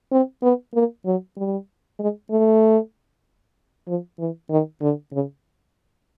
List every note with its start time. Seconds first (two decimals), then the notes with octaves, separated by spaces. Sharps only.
0.11 C4
0.43 B3
0.74 A#3
1.06 F#3
1.37 G3
1.99 G#3
2.30 A3
3.88 F3
4.19 E3
4.50 D#3
4.81 D3
5.13 C#3